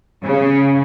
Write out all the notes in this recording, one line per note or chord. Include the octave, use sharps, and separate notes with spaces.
C#3